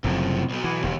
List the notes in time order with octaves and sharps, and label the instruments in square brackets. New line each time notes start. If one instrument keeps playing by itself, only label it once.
[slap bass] F#1 F#2 F3 [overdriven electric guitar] A2 C3
[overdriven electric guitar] B1 B2
[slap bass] E3
[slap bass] E1 [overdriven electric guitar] D#2